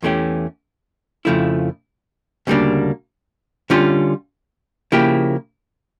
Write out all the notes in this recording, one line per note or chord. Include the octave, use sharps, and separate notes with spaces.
E2 E3 A3 C#4 G4
F2 C#3 F3 A3 E4
D2 C#3 G3 A#3 D4
D3 G3 C#4 F4
C#3 F3 A#3 E4 G4